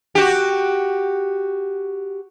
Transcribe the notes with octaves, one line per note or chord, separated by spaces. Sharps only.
F#4 G4